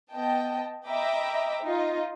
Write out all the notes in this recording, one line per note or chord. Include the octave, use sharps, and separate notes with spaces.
B3 D#5 G5 A5
D#5 E5 G5 A#5 B5 D6
D#4 F4 D#5